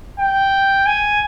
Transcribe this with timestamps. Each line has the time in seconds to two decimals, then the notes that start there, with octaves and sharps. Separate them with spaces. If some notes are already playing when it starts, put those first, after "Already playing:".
0.19 G5
0.86 G#5